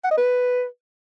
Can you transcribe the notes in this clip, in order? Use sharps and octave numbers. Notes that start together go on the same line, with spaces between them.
F#5
D#5
B4